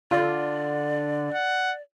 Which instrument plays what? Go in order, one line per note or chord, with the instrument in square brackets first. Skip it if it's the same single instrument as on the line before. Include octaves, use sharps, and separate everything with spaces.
[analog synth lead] D3 [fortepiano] F4 [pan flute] D5
[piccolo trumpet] F#5